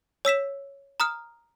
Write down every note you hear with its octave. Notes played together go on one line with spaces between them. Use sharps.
C#5 E6 B6 E7
A#5 D#6 F6